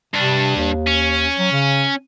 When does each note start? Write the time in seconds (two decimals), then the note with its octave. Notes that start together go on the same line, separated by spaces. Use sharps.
0.14 G2 C3 D4
0.56 D#2
0.87 C#4
1.38 F#3
1.51 C#3